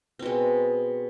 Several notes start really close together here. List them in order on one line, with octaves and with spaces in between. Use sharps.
C4 B2 G#3